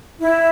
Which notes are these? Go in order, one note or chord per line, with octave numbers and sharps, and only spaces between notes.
E4